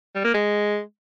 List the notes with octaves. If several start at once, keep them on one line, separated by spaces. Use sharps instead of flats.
G3
A#3
G#3